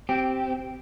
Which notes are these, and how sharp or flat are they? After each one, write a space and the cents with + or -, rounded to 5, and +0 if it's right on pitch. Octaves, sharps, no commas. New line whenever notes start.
C4 +0 G4 -15